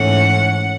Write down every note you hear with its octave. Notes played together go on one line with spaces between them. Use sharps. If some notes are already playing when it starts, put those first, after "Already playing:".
Already playing: G#2 E3 A3 C#4 F#5